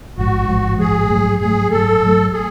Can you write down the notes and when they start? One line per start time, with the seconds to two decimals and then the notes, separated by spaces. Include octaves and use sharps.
0.18 A1 G#2 F3 G#3 F#4
0.48 A1 G#2 F3 G#3
0.79 A1 G#2 F3 G#3 G#4
1.10 G#2 F#3 A3
1.40 G#2 F#3 A3 G#4
1.71 G#2 F#3 A3 A4
2.02 G#2 F#3 A3
2.33 G#4